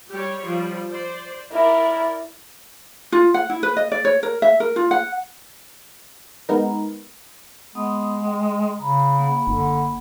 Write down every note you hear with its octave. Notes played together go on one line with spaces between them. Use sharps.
G3 G4 C#5
F3 G3
C5 D5
E4 A#4 D5
F4
F#5
E4
B4
D#5
D5
C#5
A#4
E5
A#4
F4
F#5
G#3 B3 D#4 A#4
G#3 B3 F#5 D#6
G5 D#6
C#3 A#5 B5
A#3 F#5 B5
F#1 D3